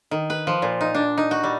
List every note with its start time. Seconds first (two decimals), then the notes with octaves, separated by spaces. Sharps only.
0.11 D#3
0.30 B4
0.47 F3
0.62 A#2
0.81 D#4
0.94 D4
1.18 D#4
1.31 F#4
1.43 G3